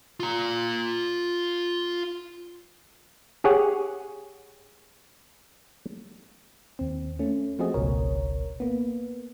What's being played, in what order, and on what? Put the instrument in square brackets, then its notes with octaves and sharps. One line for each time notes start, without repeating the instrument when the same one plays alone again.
[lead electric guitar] F4 A#5
[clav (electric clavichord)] G4 G#4 C#5 F#5
[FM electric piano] D#2 C4
A3 C#4
F3 A3 C4 F#4 G#4 D#5
G#1 C#2 B2 A#4 C#5
A#3 B3